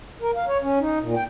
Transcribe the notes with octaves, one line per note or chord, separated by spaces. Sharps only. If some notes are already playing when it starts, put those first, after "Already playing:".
A#4
F5
C#5
C#4
D#4
A#2
G5